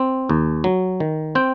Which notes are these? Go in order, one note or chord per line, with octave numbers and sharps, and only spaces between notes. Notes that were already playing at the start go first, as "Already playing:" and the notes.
Already playing: C4
D#2
F#3
D#3
C4 G5